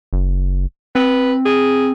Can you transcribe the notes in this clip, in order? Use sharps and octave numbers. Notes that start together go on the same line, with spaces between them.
F#1
C4 B4
G#4